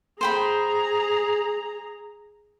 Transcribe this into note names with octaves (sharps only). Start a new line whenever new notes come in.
G#4 C5 G5 A#5 B5